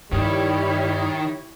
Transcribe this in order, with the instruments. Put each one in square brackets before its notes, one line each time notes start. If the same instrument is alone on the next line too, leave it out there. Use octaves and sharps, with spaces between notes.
[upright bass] G2 [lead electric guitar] D#3 [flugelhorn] G3 [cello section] E4 G4 C#5